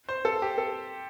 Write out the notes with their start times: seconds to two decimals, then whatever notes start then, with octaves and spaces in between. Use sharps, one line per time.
0.09 C5
0.25 A4
0.42 G4
0.58 A4